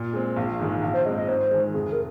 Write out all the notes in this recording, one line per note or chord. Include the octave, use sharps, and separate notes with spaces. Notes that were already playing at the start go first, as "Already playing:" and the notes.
Already playing: A#2
G#3 C4
A#1 F5
G#2 D#3 G#3
A#1 F5
C5
G#2 G#3 C4 D#5
D#5
G#2 C5
D#3 G#3
F1 G#4
A#4